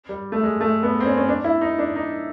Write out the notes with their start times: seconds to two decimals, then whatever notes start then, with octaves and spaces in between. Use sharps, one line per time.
0.09 G3
0.32 A3
0.43 G#3
0.61 A3
0.83 B3
1.00 C4
1.06 C#4
1.17 C#4
1.28 D4
1.44 E4
1.61 D#4
1.79 D4
1.95 D#4